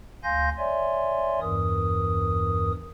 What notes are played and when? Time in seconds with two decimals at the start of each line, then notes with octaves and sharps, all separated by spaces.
0.24 D2 F5 G#5 C6 G6 A#6
0.58 C#5 D5 E5 G#5 C6
1.41 E2 G2 E3 A#4 D#6